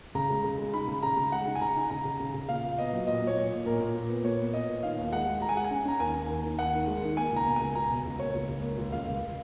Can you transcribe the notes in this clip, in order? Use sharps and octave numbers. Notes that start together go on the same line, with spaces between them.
C#3 A#5
G#3
C#3
G#3
D#4 B5
C#3
C#3 A#5
C#3
G#3 F#5
D#4
G#5
C#3 A#5
D#4
C#3 A#5
C#3
C#3
C#3
A#2 F5
A#2
B3 D#5
F#3
A#2 D#5
A#2
C#5
A#2
A#2
A#2 A#4
A#2
A#2
B3
A#2 C#5
B3
B3 D#5
A#2
D#3 F5
D#2
G#3 F#5
G#3
G#3 A#5
G#5
G#3 F#5
G#5
C#4
C#4 A#5
D#2 G#5
D#2
D#2
D#3
D#2 F#5
D#3
G#3
D#3
A#3 G#5
C#2 A#5
B2
C#2 G#5
C#2 A#5
B2
C#2
A#3 C#5
C#2
C#2
A#3
C#2
C#2 F5
C#2